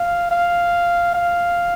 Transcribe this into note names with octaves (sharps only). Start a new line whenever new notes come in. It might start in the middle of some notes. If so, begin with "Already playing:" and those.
Already playing: F5
F5
F5